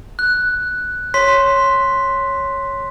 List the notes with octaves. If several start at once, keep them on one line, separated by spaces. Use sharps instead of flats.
F#6
C#5 C6 B6